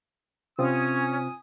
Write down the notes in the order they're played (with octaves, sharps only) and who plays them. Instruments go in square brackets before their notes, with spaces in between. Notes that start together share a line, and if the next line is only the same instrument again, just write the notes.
[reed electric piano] C3 C4 F4 [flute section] C#4 [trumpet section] G#5 D#6